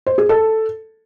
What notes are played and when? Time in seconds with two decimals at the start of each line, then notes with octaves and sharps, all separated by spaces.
0.07 C5
0.18 G#4
0.29 A4